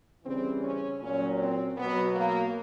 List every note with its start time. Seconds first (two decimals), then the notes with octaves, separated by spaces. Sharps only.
0.24 C#3 E3 G3 C4
0.63 C#4
1.01 A#2 F#3 C#4
1.39 C4
1.77 B2 F#3 B3
2.15 A#3